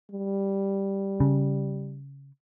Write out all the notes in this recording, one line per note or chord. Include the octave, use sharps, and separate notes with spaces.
G3
C#3